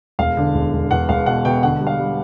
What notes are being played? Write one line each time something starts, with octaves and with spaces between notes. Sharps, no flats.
E1 F5
D3
E1
E1
E2 F#5
E1 F5
B2 F#5
B2 G5
D3 F#5
G3
F5
G3